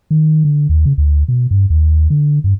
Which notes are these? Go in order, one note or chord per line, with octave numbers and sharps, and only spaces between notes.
D#3
D3
D#2
C#3
D2
B2
G2
D#2
D3
G2